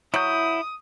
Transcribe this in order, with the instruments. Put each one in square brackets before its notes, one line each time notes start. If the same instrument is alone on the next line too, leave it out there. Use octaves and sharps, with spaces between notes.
[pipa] F#3 [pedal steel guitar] E4 G6 [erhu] D#6